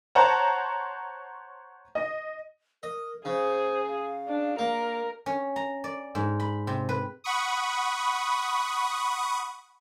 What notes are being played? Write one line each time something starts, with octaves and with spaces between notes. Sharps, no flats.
C5 C#5 F#5 A5 A#5
D#5
A#4 D#5
C#3 G#4 C5
F5
D4
A#3 A#4
C#4
A#5
D5
G#2
B5
C3
B4
F#5 B5 C#6 D#6